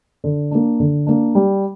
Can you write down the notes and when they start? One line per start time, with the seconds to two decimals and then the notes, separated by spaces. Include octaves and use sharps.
0.24 D3
0.51 A#3 D4
0.80 D3
1.07 A#3 D4
1.35 G3